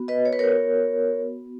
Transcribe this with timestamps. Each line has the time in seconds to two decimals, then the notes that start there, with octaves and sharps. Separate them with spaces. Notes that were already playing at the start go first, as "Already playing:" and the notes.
Already playing: B3 F#4
0.08 B4 D#5
0.25 C#5
0.33 B4
0.39 A#4 C#5